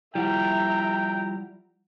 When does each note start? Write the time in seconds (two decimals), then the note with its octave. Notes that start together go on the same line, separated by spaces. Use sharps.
0.15 F3 G3 E4 E5 F#5 G5 A#5